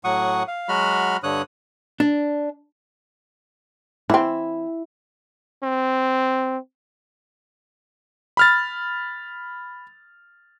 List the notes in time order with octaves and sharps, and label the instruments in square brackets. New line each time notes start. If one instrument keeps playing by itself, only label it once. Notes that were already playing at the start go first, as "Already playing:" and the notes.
[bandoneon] A2 F#3 F#5 C#6 D#6
F5
F#3 G#3 F#4 B5 F6
G2 D3 C#5 D#6 F#6
[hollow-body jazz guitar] D4
[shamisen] E3 C4 [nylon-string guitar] E4
[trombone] C4
[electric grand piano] B5 F6 A6